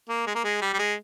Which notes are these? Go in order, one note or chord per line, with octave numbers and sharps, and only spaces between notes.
A#3
G#3
A#3
G#3
G3
G3
G#3